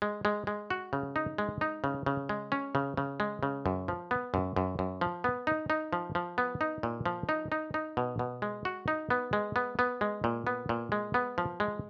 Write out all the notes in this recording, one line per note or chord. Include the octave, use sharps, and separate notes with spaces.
G#3
G#3
G#3
F#4
C#3
D#4
G#3
D#4
C#3
C#3
G#3
C#4
C#3
C#3
G#3
C#3
F#2
F3
B3
F#2
F#2
F#2
F3
B3
D#4
D#4
F3
F3
B3
D#4
A#2
F3
D#4
D#4
D#4
B2
B2
G#3
F#4
D#4
B3
G#3
B3
B3
G#3
A#2
B3
A#2
G#3
B3
F3
G#3